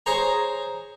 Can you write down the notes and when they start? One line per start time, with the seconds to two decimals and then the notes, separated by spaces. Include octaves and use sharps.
0.06 G#4 C5 C#5 A#5